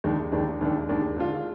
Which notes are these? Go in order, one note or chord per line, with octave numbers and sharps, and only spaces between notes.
D#2 D#3 G#3 D4
D#2 D#3 G#3 D4
D#2 D#3 G#3 D4
D#2 D#3 G#3 D4
D3 G#3 D4 F4